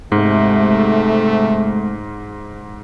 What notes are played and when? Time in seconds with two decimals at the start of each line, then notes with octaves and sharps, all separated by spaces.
0.12 G#2 C3 G#3 A3